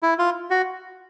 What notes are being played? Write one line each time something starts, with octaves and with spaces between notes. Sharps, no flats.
E4
F4
F#4